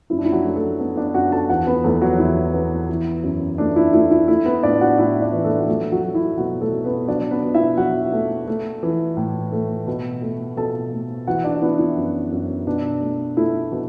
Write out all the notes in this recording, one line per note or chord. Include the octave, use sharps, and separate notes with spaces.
F#2 E4
D4
E4
F#3 F#4
A3
A3 A4
A3 B3 B4
D4 D5
F#2 F#4 F#5
A4 A5
E2 F#4 F#5
B3 B4
E2 A3 A4
F#3 F#4
E2 E4
B3
E3
F#2
A3 D4
E4
A3 E4
E4
A3 E4
B3 B4
A2 D4 D5
F#4 F#5
A2 E4 E5
D4 D5
E3
A3 A4
F#4
F#3 A3 A4
F#3 F#4
F#3
E4
B2 F#3 F#4
A3 A4
B2
B3 B4
F#3 D4 D5
B3 B4
B2
E4 E5
F#3 F#4 F#5
A3
A3
E3
A2
A3
B2
A3
B2 A4 A5
A3
E3 F#4 F#5
D4 D5
B3 E4
E4
F#2
F#2
B2 D4
A3
A3 E4
B2